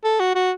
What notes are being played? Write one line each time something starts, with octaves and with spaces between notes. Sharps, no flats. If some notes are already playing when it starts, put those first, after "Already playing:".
A4
F#4
F#4